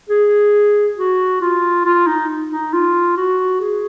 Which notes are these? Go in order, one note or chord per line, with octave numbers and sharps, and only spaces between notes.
G#4
F#4
F4
F4
D#4
D#4
F4
F#4
G#4